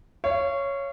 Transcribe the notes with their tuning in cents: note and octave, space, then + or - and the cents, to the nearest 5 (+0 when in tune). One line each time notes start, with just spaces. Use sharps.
C#5 +0 F5 -35